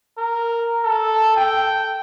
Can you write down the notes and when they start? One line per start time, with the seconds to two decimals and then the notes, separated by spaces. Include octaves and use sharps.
0.18 A#4
0.84 A4
1.36 G5